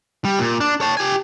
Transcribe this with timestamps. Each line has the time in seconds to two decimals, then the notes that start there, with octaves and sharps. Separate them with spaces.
0.25 G3
0.39 A#2
0.61 D4
0.81 C#5 A5
0.97 G4 G#5